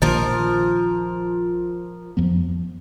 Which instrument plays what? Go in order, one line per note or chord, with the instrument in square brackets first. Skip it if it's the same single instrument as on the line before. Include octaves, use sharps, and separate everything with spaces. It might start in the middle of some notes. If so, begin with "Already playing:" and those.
[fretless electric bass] A#1 D#3 A#3 [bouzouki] F3 A#4
[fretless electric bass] F2 F3 B3